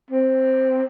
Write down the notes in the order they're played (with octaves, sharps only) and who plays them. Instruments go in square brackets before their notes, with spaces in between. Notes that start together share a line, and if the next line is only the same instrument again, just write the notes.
[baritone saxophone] C4